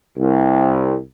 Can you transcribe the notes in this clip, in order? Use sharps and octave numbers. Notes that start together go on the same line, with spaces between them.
C2